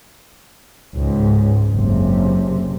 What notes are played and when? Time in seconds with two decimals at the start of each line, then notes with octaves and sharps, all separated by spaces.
0.96 C#2 G#2
1.74 F#1 C3